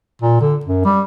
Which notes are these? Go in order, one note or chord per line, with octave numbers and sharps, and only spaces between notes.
A#2
D3
F#2
G3